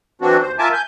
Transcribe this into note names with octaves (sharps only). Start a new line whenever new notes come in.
E3 F#3 C4 D4 F#4
D#2 C5
F4 A#4 E5 G#5 A5 D6
G#5 G6